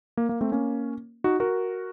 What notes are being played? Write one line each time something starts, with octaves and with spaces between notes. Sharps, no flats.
A#3
A#3
A3 C4
A#3 C#4
D#4 F#4
F#4 A#4